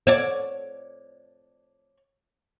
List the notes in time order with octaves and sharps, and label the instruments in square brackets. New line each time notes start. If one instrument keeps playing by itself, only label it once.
[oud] C#5 D5